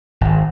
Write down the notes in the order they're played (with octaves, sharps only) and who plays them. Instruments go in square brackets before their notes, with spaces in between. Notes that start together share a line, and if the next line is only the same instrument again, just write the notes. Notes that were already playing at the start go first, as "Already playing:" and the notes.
[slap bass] G#1